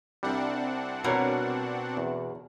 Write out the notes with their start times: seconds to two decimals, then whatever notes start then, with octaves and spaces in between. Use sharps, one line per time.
0.23 C2 G3 C4 D4 F#5
1.04 B2 F#4 A#4 C#5
1.97 E2